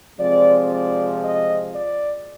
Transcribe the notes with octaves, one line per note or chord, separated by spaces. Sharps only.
C3 F3 G#3 C4 D5
D5
D#5
D5